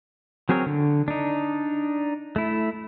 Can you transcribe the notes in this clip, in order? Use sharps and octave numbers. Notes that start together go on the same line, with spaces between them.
F#3 C4 G#4 A#4 C#5
D3
D4 D#4
A3 E4